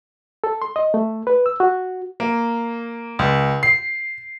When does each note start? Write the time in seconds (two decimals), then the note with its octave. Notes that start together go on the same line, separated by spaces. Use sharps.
0.44 A4
0.62 C6
0.76 D#5
0.94 A3
1.27 B4
1.46 E6
1.60 F#4
2.20 A#3
3.19 C#2
3.63 C7